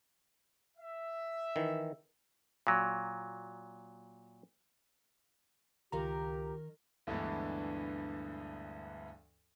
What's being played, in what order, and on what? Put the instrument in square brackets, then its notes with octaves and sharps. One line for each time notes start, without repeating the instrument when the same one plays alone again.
[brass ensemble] E5
[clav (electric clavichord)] D#3 E3
A#2 F#3
[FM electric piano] C#2 F4 A#5 [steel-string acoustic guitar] D#3 A#4 [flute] G4
[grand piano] D2 G2 D3 E3 G#3 B3